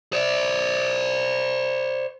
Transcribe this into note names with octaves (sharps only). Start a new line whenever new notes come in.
C5 D5